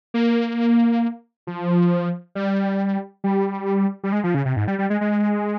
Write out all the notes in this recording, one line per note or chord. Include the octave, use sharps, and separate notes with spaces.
A#3
F3
G3
G3
G3
G#3
F3
C#3
C3
G#2
G3
G3
G#3
G#3